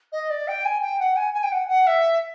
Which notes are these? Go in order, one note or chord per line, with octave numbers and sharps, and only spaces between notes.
D#5
D5
G5
G#5
G5
F#5
G#5
G#5
G5
F#5
F#5
E5